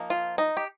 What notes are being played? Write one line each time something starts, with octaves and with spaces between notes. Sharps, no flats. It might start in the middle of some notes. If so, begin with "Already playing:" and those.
Already playing: F3 A#3 D#4
F4
D#4
G4